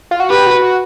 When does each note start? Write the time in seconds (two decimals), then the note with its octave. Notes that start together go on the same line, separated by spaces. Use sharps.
0.11 F4
0.20 F#4
0.30 G4 B4
0.47 F#4
0.62 F#4